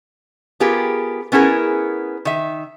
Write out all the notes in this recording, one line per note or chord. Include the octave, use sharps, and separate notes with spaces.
B3 F4 G4 G#4 A#4
B3 C#4 E4 G#4 A#4
D#3 E5